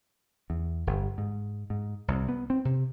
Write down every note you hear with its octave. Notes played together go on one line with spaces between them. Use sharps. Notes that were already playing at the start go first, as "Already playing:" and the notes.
E2
G1
G#2
G#2
C2
B3
C4
C3